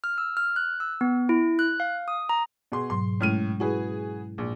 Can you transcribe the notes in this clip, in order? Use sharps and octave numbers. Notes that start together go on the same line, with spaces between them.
F6
E6
F6
F#6
E6
B3
E4
F#6
F5
D#6
A#5
B2 G#4 C6
G#2 B2 F#3 C6
A2 G#3 C#4 F6 D#7
E4 F#4 G#4 B4
A#1